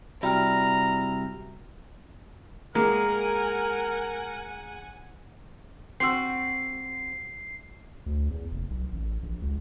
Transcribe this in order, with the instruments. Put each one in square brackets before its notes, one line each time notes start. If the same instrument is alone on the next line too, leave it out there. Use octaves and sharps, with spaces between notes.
[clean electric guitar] C3 G3 E4 [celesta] F#4 G5 F6 [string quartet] A#5
[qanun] G#3 [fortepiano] A#3 [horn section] A#4 [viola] F#5 G#5
[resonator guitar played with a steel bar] C4 F#4 [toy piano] C6 E6 [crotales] C7
[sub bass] D2
E2
F1
B1
A1
A#1
C#2